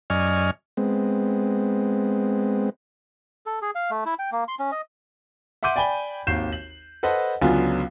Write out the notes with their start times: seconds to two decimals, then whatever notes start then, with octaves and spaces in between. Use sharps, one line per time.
0.10 F#2 D5 D#5 G#5 C#6 F6
0.77 G#3 B3 C4
3.46 A4
3.62 G#4
3.75 F5
3.91 A3
4.06 E4
4.19 G5
4.32 A#3
4.48 C6
4.59 C#4
4.72 D#5
5.63 E5 F#5 C6 D6 G6 D#7
5.76 D5 G5 G#5 B5 G7
6.27 G#1 D#2 G6 C7 E7
6.53 F#7
7.03 A4 B4 C5 D#5 F#5 A5
7.42 C#2 D3 F#3 B3 F4 G#5